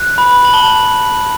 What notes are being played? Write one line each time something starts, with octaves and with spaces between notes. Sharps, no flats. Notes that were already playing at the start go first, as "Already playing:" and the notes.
Already playing: F#6
B5
F#7
A5 G7